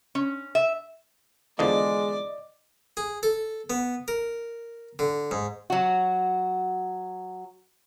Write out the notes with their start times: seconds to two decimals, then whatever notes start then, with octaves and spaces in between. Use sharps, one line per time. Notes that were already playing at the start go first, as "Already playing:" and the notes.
0.15 C#4
0.55 E5
1.59 E2 D3 F3 G#3 D5 D#5
2.97 G#4
3.23 A4
3.70 B3
4.08 A#4
4.99 D3
5.31 G#2
5.70 F#3 F#4